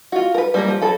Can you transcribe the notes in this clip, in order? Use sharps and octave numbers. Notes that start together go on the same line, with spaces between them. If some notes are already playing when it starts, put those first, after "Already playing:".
F4 F#4
A#4 B4
G3 A#3 A#4
F3
F#3 A4 B5